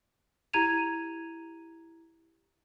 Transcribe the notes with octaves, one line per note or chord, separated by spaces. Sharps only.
E4 G4 A#5 G#6 D#7 F7